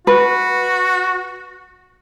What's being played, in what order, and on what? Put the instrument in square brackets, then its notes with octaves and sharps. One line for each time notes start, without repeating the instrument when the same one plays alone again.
[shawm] F#4 [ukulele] B4